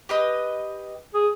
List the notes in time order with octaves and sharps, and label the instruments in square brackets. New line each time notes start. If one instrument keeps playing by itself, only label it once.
[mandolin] G4 B4 D#5
[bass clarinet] G#4